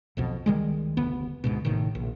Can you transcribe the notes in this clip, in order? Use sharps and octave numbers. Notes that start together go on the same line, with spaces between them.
B1 F2 B2
C#2 D#3 G3 G#3
F1 D2 B3
D2 G#2 B2
A1 A2 C3 D#3
A#1